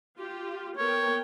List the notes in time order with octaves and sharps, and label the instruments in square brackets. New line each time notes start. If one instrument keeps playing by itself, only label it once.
[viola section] F4 G4
[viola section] B3 A#4 G5 [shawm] C#5